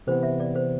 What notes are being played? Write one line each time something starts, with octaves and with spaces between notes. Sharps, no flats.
C3 E3 B3 C5
E5
D5
C5